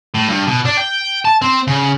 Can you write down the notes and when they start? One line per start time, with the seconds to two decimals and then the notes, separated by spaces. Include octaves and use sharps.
0.14 A2
0.28 G2
0.47 B2
0.65 D4
0.77 G5
1.25 A5
1.42 C4
1.67 C#3